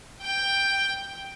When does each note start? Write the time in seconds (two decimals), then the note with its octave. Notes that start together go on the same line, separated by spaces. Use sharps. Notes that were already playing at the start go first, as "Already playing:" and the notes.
0.21 G5